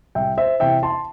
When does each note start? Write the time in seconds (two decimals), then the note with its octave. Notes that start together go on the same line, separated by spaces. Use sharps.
0.15 C2 E5 G5
0.37 C5 E5
0.60 C3 E3 E5 G5
0.83 A5 C6